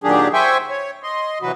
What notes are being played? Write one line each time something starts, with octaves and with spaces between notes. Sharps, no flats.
A#2 D#3 F#3 D4 G4 G#4
C5 E5 G5 G#5 C#6
C#5
D#5 C6
C3 E3 F#3 F#4 B4